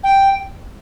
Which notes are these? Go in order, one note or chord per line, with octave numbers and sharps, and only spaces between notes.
G5